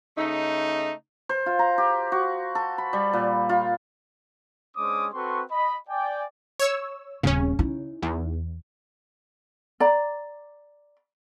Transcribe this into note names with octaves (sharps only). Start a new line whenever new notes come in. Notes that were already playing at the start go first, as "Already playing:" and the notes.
C#3 A3 D#4
C5
F4
A#5
G4
F#4
A4
B5
G3
A#2
F4
G#3 C#4 D4 C5 D6 D#6
C4 F#4 A4 B4 C6 C#6
D#5 B5
D5 G5 G#5
C#5 E6
D#1 C#3 C4 C#4
D#4 E4
E2
D5 A#5